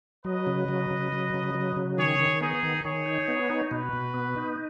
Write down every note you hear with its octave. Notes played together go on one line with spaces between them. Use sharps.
F#3 B4 D#5
C#3
F#3
C#3
F#3
C#3
F#3
C#3
D#3 G#4 C#5
D#3
B3 D#4 G#4
D#3
D#3 G#4 C#5
D#4
B3
D#4
B2 F#4 B4
B2
B3
D#4